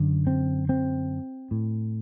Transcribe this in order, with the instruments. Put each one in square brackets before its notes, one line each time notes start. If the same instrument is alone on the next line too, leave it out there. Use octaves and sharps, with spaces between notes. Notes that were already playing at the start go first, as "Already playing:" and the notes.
Already playing: [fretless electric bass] F#2 D3
C4
C4
A2